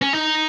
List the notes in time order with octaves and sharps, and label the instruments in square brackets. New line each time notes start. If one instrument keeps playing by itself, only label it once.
[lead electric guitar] C#4
D#4